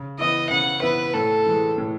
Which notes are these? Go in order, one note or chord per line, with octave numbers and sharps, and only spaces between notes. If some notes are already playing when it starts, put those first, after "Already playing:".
Already playing: C#3
E3 B3 E4 D#5
C#3 F#5
E3 B3 E4 B4
A2 A4
E3 G#3
A2